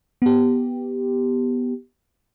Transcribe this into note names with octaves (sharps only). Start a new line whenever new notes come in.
B3 G4